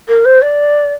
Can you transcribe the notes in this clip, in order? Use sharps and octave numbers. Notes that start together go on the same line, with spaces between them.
A#4
C5
D5